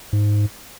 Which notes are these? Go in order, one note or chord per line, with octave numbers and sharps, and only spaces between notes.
G#2